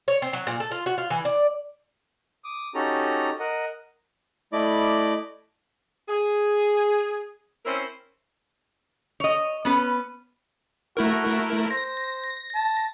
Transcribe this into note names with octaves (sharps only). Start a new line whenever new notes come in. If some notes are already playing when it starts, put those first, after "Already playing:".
C#5
C4
F#3
A#2
A4
F4
F#4
F4
E3
D5
D6 D#6
C#4 D#4 F#4 G4 A4 A#5
A#4 D#5 F#5
A3 E4 D5 D#5 B5 D6
G#4
C4 C#4 E4 A#4 C5
C#5 D#5
B3 C#4 B4
A3 E4 F#4 A#4
C5 A#6
A5